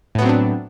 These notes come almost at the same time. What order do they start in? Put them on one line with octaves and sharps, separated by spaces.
A2 B3 F#3 C4 D4